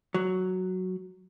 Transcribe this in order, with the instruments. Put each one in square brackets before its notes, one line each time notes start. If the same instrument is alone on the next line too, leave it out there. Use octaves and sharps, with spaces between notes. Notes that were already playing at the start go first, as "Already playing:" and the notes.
[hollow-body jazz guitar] F#3